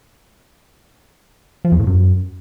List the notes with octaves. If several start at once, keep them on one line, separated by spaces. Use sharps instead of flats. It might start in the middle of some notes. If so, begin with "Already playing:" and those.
F3
E2
A2
F#2